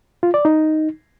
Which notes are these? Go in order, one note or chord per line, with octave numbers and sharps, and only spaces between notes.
F4
D5
D#4